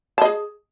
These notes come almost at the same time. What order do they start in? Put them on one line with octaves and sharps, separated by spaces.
A5 D#5 G#4